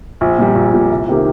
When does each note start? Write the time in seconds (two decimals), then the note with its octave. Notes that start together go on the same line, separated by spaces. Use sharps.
0.21 A#1
0.38 A#2 G3
0.56 A#1
0.74 A#2 G3
0.91 C2
1.08 C3 D#3 A#3 G4